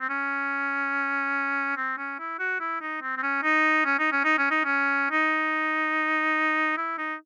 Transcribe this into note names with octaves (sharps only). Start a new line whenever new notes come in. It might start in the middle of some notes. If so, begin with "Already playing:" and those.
C4
C#4
C4
C#4
E4
F#4
E4
D#4
C4
C4
C#4
D#4
C#4
D#4
C#4
D#4
C#4
D#4
C#4
D#4
E4
D#4